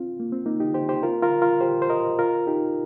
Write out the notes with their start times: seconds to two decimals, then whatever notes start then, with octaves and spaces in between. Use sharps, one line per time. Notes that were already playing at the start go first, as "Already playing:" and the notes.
Already playing: C4 F4
0.20 A#3
0.32 C4
0.46 A#3 D#4
0.60 D#4 G4
0.74 G4 C5
0.89 G4 C5
1.03 F4 A#4
1.22 F4 A#4
1.42 F4 A#4
1.61 G4 C5
1.82 C5
1.90 A#4 D#5
2.19 F4 A#4
2.47 D#4 G4